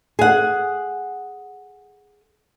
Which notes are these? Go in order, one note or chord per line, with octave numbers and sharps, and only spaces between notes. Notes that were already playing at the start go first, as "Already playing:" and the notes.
G#4 F#5